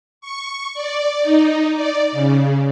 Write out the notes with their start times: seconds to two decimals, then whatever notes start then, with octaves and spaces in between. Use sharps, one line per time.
0.21 C#6
0.74 D5
1.22 D#4
1.75 D5
2.12 C#3